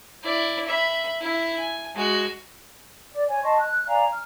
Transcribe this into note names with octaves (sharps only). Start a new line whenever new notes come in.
E4 D5
E5 B5
E4
G#5
G#3 F#4
D5
C#5 G#5
D#5 A5 C6 C#6
F#6
D5 F5 G#5 A#5
F6